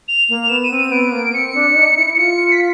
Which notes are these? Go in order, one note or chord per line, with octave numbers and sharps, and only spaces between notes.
F7
A#3 F7
B3 E7
D#7
C4
D#7
B3 D7
A#3
C4 C#7
D4
D4
D#4
E4
F4 C#7
B6